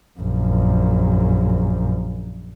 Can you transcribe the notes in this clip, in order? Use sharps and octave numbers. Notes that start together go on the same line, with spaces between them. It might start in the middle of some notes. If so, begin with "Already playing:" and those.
A#1 F#2